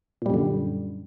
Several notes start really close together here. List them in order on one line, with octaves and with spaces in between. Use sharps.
A#2 G3 F#2 D3